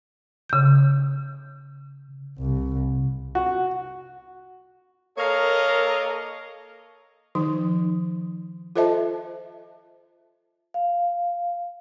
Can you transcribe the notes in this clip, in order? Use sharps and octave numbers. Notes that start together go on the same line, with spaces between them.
C#3 G6
C2
F#4
A#3 A4 A#4 C#5 D#5 F5
D#3 F3 D#4
F4 A4 C5 D#5 E5 A5
F5